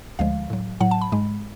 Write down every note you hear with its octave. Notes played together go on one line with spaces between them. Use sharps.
D2 D3 F3 G#3 F5
A2 F#3
A2 F#3 F#5
A5
B5
G#2 G#3